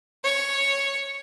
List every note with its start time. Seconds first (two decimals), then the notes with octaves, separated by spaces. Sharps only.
0.24 C#5